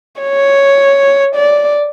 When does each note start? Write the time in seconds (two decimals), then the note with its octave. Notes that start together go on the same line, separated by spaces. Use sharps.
0.21 C#5
1.36 D5